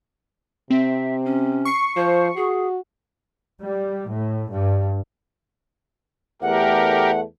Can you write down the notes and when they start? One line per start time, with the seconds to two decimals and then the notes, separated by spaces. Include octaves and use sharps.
0.70 C3 C4 E5
1.25 C#4
1.65 C#6 C7 C#7
1.97 F3 C5
2.36 F#4 G#4
3.61 G3
4.09 A2
4.50 G2
6.42 E2 A3 G4 A#4 F#5